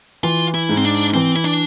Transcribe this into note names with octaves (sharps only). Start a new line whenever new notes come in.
E3 F4
E4
G#2
C4
D4
E3 C4
E4
D4